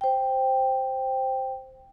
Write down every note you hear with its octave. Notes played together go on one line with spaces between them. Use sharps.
C5 G5